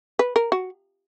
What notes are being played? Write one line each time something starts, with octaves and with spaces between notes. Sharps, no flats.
B4
A#4
F#4